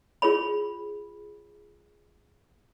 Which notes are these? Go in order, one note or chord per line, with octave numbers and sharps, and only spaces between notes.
F4 G#4 C#5 B5